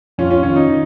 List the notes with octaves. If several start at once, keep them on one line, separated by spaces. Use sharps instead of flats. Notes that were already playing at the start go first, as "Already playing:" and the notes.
F2 C#4 F4
C#4 F4
D#3 C#4 F4
D#4
D#3